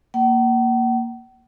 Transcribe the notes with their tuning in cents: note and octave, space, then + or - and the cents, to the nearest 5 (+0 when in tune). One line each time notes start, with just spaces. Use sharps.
A#3 +0 F#5 +45